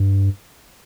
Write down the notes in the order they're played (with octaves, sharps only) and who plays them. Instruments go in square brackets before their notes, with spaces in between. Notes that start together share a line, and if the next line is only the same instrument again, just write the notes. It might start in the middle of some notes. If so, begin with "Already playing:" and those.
Already playing: [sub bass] G2